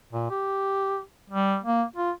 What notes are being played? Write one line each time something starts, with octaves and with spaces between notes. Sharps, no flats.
A#2
G4
G3
A#3
F4